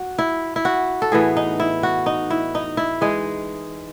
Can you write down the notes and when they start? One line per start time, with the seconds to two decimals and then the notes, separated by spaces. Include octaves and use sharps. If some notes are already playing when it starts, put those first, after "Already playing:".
Already playing: F#4
0.18 E4
0.56 E4
0.65 F#4
1.02 A4
1.12 A2 E3 B3 G#4
1.37 D#4
1.60 E4
1.83 F#4
2.06 D#4
2.30 E4
2.55 D#4
2.77 E4
3.01 E3 G#3 D#4 G#4